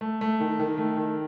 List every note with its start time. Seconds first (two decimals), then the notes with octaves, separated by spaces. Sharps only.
0.01 A3
0.21 A3
0.40 D#3
0.60 D#3
0.78 A3
0.97 D#3